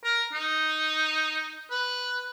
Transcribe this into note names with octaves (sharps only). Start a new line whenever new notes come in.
A#4
D#4
B4